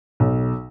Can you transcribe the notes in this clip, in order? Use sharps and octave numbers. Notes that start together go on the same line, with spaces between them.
B1